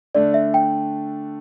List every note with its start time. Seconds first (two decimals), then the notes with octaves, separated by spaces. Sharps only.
0.15 D3 A3 D4 D5
0.34 E5
0.54 G5